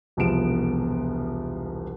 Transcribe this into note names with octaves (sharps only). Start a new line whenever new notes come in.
E1 C2 F3 B3 D7 E7